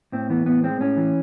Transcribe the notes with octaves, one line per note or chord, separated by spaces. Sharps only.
A2 C4
E3 B3
A2 B3
G#3 C4
A2 C#4
E3